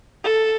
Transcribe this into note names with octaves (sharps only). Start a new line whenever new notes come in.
A4